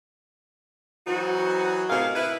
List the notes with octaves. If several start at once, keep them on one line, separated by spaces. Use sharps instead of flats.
E3 F#3 C4 D#4 F#4
A2 C3 D#4 G#4 A#4 F5
E4 B4